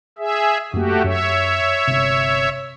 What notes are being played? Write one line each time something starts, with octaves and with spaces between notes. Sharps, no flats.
G#4 E5
F#2 A3 A#3 F#4 G4
F#2 C#5 E5
G1 C3